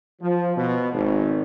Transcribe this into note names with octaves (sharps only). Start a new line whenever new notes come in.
F3
B2
G#1